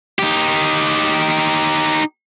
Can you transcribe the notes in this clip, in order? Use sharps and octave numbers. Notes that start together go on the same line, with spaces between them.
D#4 G4